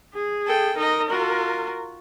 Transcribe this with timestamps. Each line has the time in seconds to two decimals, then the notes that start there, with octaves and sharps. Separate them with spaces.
0.14 G#4
0.47 A4 G5
0.77 D#4 A#4 D#5
1.10 F4 F#4